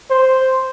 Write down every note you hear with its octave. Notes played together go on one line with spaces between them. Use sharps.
C5